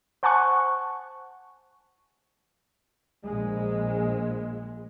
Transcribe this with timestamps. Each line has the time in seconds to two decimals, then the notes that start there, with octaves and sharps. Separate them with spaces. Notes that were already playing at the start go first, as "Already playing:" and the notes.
0.23 C5 F#5 G#5 A5 C#6 F#6
3.24 A#1 G#3